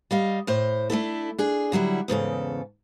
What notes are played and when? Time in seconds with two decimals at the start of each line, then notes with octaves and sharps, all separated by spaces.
0.11 G3 D#5 F5
0.47 A2 C5
0.90 A3 D4 E4 A4
1.38 D4 G#4
1.72 D3 F#3 G3 E4
2.08 E2 G#2 C#3 A4